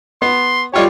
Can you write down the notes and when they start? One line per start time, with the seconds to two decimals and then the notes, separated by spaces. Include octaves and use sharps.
0.22 B3 C6
0.74 G3 F4 G4 C#5